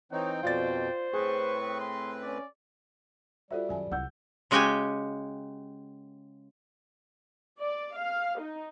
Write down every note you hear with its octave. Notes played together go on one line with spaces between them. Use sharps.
E3 C4 D#4 C#5 G5
F2 B2 F4 C5 D5 A6
A2 C4 G#4 B4 C#6
C6
C#4 D5
G3 F4 F#4 A4 C5 E5
F#2 D#3 F#3 G#5 A5
C2 E4 F#5 E6 G6
C#3 G#3 F#4 G4 G5 G#5
D5
F5
D#4